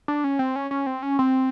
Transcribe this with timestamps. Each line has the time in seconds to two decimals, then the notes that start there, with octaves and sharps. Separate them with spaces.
0.08 D4
0.24 C#4
0.39 C4
0.56 C#4
0.71 C#4
0.87 C4
1.03 C#4
1.19 C4